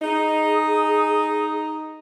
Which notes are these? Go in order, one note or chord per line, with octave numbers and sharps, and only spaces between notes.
D#4 G#4